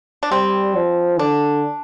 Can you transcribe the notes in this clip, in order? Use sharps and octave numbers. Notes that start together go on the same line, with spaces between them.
D4
G3 C4
F3
D3 D4